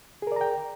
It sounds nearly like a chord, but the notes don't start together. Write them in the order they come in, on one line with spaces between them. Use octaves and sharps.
G#4 A#4 D5 A#5 G5